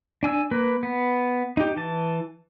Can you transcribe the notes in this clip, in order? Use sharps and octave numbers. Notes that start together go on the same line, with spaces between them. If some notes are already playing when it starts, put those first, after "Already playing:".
D4 G#5 E6
A#3 B4
B3
D#4 G4
E3 A5